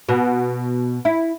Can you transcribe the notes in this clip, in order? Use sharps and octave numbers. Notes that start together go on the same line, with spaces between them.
B2
E4